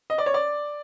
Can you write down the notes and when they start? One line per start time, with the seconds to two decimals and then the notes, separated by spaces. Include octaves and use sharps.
0.10 D#5
0.18 D5
0.26 C#5
0.34 D5